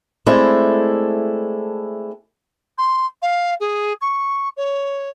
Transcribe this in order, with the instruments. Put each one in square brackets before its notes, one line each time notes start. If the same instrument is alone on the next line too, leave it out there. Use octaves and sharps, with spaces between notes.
[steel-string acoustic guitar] G#3 A3 C4 D4 E4 A4
[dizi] C6
F5
G#4
C#6
C#5